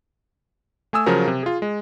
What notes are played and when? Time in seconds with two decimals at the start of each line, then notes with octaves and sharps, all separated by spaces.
0.93 A3 G#5 D#6 E6
1.06 C#3 F3 F#3 A#4
1.28 C3
1.43 F4 G#4
1.62 G#3